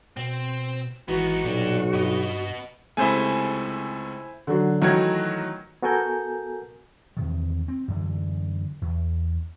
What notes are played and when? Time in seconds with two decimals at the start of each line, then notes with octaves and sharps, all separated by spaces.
0.17 B2 C4
1.08 G#1 E3 B3 D#4 F#4
1.45 B1 A#2 G3 D4
1.94 G2 B3 D#5
2.97 C#2 C3 A3 E4 C5 G#5
4.47 D3 F#3 F#4
4.82 D#3 E3 F#3 A3 F#4 G#6
5.82 B3 F#4 A4 A#4 G#5 G6
7.17 E2 C3 D#3
7.68 C4
7.88 F#2 D3 E3
8.81 E2